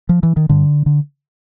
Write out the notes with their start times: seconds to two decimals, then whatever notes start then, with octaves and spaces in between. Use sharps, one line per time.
0.09 F3
0.23 E3
0.37 D#3
0.49 G2 D3
0.86 D3